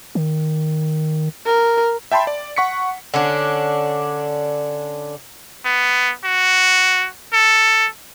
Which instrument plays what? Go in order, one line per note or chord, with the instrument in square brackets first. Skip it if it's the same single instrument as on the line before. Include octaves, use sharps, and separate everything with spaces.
[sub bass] D#3
[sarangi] A#4
[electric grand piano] E5 G5 A5 B5 C6
D5
F#5 C#6 B6 C#7
[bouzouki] D3 C#4 D4
[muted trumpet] B3
F#4
A4